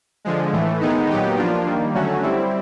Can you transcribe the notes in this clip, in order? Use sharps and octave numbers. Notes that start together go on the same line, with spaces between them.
D3 F3 G#3
A2 E3 A3
D#3 G#3 B3 D#4
A#2 F#3 B3 D#4 G4
F3 A#3 D4 F4
D#3 G3 A#3
D3 F#3 A3 C#4 F#4
G3 C4 E4